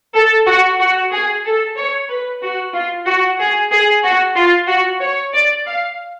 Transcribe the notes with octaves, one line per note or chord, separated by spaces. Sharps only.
A4
F#4
F#4
G#4
A4
C#5
B4
F#4
F4
F#4
G#4
G#4
F#4
F4
F#4
C#5
D5
F5